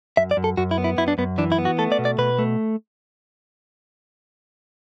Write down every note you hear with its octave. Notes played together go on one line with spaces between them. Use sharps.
F#2 E5
D5
F#2
A4
F#2 F#4
E4
B3
E4
F#2 E4
D4
F#2 B3
E3 D4
E4
B3
F#4
A3 A4
D5
B2
D5
B2 B4
A3